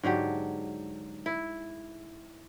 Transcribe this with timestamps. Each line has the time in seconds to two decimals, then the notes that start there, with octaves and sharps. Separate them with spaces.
0.03 G#2 D3 F#3 G4
1.26 E4